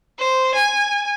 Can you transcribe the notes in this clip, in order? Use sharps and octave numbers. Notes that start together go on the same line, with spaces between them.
C5
G#5